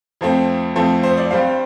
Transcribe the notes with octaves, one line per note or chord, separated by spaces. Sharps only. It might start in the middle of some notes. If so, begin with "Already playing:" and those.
F2 F3 A3 C4
F2 F3 A3 C4
C5
D5
G2 G3 C4 C5 F5